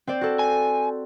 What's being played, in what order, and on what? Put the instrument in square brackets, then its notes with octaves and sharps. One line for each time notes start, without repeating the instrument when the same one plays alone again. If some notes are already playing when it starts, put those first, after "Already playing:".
[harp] C4 C5 D5
F#4 A4
[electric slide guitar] G#5